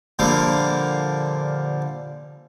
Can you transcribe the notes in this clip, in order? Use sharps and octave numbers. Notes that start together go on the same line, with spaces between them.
A#2 D3 F3 G3 A#3